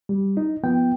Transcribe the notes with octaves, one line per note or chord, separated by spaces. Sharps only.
G3
D#4
F3 B3 G5